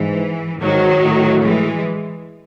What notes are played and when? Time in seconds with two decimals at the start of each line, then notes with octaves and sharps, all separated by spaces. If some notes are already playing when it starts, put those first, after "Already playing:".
Already playing: G#2 E3
0.61 G#2 D#3 F#3
1.02 A2
1.43 E3 G#3